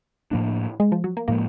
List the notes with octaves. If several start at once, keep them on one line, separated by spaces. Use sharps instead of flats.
A2 F3 A#3 D4
G#3
F3
F#3
A#3
A2 F3 G#3 A#3